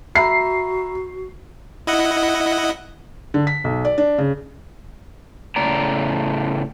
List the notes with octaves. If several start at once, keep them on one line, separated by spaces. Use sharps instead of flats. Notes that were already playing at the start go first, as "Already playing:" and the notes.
F#4 E5 A#5 B5 C7
E4 D#5 F#5
D3
B6
B1
D5
D4
C#3
A2 C#3 A3 D5 A#5